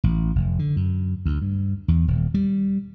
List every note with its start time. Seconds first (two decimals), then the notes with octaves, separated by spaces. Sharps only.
0.04 A1
0.35 F1
0.59 D3
0.76 F#2
1.26 D2
1.42 G2
1.88 E2
2.08 D#1
2.34 G3